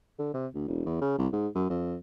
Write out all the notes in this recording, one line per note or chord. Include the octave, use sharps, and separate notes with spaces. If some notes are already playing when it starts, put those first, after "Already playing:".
D3
C3
D2
E1
E2
C#3
C2
G#2
F#2
F2